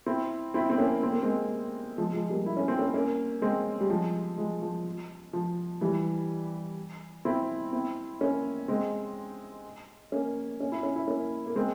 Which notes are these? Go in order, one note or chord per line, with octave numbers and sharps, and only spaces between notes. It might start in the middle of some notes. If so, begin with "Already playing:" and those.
C4 E4
C4 E4
C4
A#3 C#4
C4
A#3
G#3 C4
F3 G#3
F3 G#3
G3 A#3
E4
C#4
C4
A#3 C#4
A#3 C#4
G#3 C4
G3
F3 G#3
F3 G#3
F3
F3
E3 G3
C4 E4
C4 E4
A#3 C#4
G#3 C4
A#3 C#4
C#4
E4
C#4
E4
A#3 C#4
A#3
G#3 C4